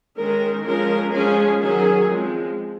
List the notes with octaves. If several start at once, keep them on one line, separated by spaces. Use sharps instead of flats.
D#3 G#3 C#4 A#4
F3 G#3 C#4 A#4
F3 G#3 C#4 G#4
D#3 F#3 C#4 G#4
F3 G#3 C4